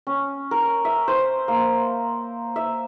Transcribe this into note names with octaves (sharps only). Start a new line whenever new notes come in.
C#4
A#4
E5
C5
A#3
E5